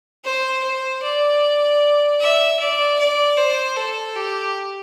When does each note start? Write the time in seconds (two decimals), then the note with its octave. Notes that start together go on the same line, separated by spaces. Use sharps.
0.24 C5
0.63 C5
1.03 D5
2.20 E5
2.59 D5
2.99 D5
3.37 C5
3.77 A4
4.16 G4